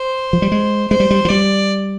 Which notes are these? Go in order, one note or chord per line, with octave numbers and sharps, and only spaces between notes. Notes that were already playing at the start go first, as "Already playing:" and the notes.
Already playing: C5
F3
G3
G#3
G#3 C5
G3
G3
F3
G3 D5